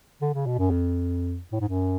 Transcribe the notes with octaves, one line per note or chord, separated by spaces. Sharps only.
D3
C#3
B2
F#2
F2
A2
G#2
F#2